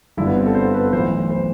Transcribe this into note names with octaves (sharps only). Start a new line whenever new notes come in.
G1 G2 D3 E4
B3
C4
A4
C5
B4
B1 A2 E3 C5
C5